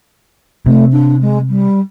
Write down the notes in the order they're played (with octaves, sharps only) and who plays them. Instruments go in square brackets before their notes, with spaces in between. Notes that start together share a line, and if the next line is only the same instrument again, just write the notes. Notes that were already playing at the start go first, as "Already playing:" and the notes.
[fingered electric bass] C3 [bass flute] A3
[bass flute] D4
G#3
G3